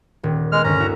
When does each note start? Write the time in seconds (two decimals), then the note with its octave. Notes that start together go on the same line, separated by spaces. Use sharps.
0.23 D#1
0.52 G#3 B3 F6
0.64 D2 G2 C#4 A#5
0.80 E4 F#4 E5